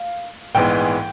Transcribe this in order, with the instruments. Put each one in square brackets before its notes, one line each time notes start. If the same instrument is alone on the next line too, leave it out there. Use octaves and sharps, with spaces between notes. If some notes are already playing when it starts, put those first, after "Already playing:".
Already playing: [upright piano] F5
[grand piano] A#1 G#2 E3 G#3 B3 [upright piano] G5